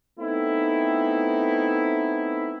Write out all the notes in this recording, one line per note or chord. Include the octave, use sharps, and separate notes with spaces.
A3 B3 C4 D#4 E4